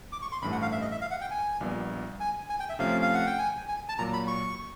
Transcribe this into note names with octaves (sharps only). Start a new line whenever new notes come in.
D6
C#6
C6
A1 G2 E3 A3 B5
F#5
F5
E5
D#5
E5
F5
F#5
G5
G#5
A#1 A#2 G3 B3
G#5
G#5
G5
E5
C3 F3 A3 C#4 F5
F5
F#5
G5
G#5
G#5
A5
A#2 F#3 A#3 A#5
B5
C#6